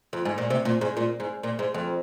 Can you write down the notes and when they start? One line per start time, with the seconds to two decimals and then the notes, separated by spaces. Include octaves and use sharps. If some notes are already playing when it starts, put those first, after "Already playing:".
0.13 F2
0.25 G#2
0.38 A#2
0.50 C3
0.65 A#2
0.81 G#2
0.97 A#2
1.20 G#2
1.43 A#2
1.59 G#2
1.74 F2